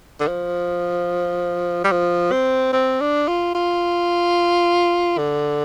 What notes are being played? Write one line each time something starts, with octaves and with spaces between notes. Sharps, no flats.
D3
F3
G3
F3
C4
C4
D4
F4
F4
D3